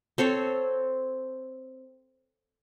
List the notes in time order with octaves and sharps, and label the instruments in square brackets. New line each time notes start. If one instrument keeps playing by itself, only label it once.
[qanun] C4 A4 C5 C#5